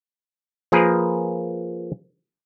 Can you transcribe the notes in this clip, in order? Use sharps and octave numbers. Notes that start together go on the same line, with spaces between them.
F3 A#3 G#4 A#4 B4